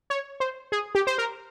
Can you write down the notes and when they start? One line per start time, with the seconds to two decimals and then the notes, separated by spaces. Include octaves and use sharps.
0.10 C#5
0.40 C5
0.72 G#4
0.95 G4
1.07 C5
1.18 A#4